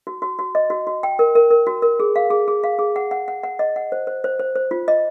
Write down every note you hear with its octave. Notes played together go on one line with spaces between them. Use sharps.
F#4
F#4
F#4
D#5
F#4
F#4
G5
A#4
A#4
A#4
F#4
A#4
G#4
F5
G#4
G#4
F5
G#4
F#5
F#5
F#5
F#5
D#5
F#5
C5
C5
C5
C5
C5
F4
D#5